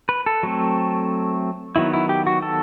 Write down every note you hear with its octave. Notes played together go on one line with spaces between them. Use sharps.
B4
A4
F#3 A3 C4
D#3 F#3 B3 E4
E4
G4
F#4
A4